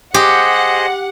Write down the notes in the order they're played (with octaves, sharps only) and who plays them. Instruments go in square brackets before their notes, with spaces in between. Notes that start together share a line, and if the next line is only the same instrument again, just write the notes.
[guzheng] G4 [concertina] G#4 C5 D#5 [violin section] F#5